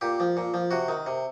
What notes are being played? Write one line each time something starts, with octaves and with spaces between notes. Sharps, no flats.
A#2 G4
F3
A#2
F3
C3 F#4
D#3
C3